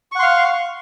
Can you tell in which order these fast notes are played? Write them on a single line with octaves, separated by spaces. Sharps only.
C#6 F#5 C6 F5